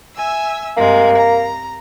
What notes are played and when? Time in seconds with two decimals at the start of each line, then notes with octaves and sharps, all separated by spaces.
0.16 E5 G#5 E6
0.77 G2 C3 G#3 A#3
1.17 A#5